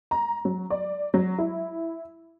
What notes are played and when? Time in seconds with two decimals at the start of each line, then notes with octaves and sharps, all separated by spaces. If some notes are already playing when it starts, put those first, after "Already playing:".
0.11 A#5
0.45 F#3
0.70 D5
1.14 F#3
1.38 E4